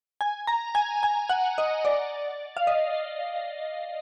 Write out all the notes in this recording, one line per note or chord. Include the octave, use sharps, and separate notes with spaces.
G#5
A#5
G#5
G#5
F#5
D#5
D5
F5
D#5